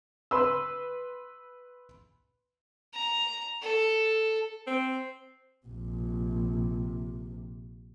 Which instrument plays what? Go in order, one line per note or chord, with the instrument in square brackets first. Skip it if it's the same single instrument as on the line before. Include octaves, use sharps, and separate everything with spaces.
[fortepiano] B4 C6 E6
[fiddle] A#5
A4
[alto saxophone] C4
[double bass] A#1 C3